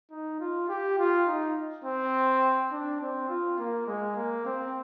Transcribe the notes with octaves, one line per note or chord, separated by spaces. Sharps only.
D#4
F4
G4
F4
D#4
C4
D4
C4
F4
A#3
G#3
A#3
C4